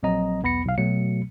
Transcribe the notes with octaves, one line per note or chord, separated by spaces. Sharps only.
A#1 F#3 C4 D#5 A#5
B1 E2 B3 B5 A#6 C#7
B1 F5
B2 F#3 A3 C#7